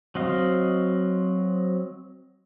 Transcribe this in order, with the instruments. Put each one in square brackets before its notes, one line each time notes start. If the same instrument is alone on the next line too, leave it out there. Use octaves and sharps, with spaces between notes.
[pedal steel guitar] F#3 C4 D#5 F5